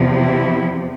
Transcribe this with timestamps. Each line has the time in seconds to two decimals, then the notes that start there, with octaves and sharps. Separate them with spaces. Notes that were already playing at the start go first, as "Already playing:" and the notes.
Already playing: E2 C3 F3
0.11 E4